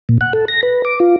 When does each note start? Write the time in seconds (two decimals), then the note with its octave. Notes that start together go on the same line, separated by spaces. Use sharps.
0.09 A#2
0.21 F#5
0.33 A4
0.48 A#6
0.63 B4
0.85 D6
1.00 F4